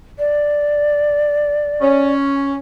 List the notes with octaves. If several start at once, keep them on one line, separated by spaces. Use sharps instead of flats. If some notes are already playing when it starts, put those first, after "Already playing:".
D5
C#4